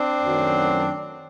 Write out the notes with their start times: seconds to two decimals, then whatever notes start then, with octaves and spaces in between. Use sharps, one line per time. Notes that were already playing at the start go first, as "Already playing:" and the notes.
Already playing: C4 D4
0.23 F#2 D#3 F#3 A3